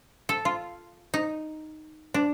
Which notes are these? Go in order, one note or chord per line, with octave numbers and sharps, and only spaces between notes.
A4
F4
D#4
D4